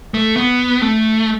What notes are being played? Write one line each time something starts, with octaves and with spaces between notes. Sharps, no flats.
A3
B3
A3